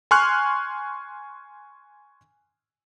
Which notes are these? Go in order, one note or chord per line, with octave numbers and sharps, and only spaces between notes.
G#5 C6 C#6 F6 F#6